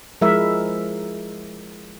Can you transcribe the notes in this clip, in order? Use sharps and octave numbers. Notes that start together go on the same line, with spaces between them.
F3 G#3 E4 A#4 E5